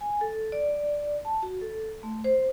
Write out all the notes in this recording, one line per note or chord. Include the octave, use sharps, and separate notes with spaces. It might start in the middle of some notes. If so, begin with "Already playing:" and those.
G#5
A4
D5
A5
F#4
A4
A3
C5